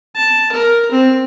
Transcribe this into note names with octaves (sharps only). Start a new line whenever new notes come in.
A5
A#4
C4